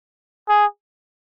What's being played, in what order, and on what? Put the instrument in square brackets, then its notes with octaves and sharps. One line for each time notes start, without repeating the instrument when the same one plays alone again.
[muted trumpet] G#4